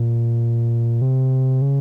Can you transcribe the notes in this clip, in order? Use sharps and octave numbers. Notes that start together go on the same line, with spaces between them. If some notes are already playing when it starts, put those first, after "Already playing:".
Already playing: A#2
C3
C#3